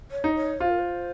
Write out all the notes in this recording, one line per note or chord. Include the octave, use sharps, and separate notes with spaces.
C#5
D#4
C#5
F4 C5
A#4
C5